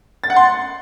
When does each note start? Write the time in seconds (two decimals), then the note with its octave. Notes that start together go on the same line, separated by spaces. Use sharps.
0.24 A6
0.30 F#5
0.36 C6